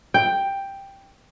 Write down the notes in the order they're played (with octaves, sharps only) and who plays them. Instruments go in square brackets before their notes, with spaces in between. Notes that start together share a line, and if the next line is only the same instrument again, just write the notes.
[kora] G5